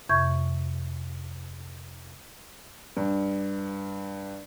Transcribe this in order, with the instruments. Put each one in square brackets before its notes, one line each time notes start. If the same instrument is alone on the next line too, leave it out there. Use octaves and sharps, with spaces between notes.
[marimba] F2 C3 E5 C#6 G6 G#6
[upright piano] G2